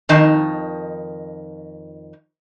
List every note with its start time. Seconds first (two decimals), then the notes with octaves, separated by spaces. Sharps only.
0.09 F2 D#3 D#4 A#4 A5